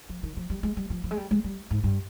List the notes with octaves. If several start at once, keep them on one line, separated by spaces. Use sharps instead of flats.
F3
D#3
F3
G3
G#3
G3
F3
F3
G#3
G3
G#3
G3
G#2
G2